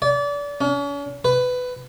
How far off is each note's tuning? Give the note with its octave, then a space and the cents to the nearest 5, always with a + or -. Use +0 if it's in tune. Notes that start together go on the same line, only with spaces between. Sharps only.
D5 -30
C#4 +40
B4 +15